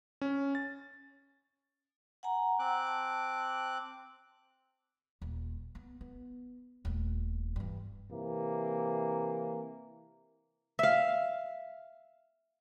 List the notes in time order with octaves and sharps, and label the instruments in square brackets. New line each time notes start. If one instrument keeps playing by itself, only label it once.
[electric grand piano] C#4
A6
[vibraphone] F#5 G#5 A#5
[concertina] C4 D6 F#6
[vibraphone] A5
[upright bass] D#1
B3
B3
D#1 A3
G2 E3
[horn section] C3 E3 A#3
[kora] E5 F5